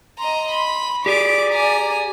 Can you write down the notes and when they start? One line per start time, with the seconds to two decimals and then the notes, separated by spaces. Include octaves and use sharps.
0.19 D#5 A#5 C6
0.51 B5
1.06 G4 G#4 D5 D6
1.50 G#5 A#5